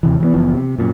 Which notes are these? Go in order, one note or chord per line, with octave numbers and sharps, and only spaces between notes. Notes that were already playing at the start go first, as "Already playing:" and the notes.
D#2 C3 E3
E3 F#3 B3
F#1 E3 F3 B3
C3
F#2 A#2